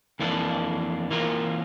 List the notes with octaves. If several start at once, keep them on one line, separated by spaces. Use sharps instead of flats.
F2 E3 A#3 D4
E3 A#3 F4 A#4